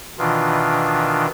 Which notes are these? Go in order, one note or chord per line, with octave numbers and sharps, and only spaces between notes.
B2 D#3 E3 D4 F4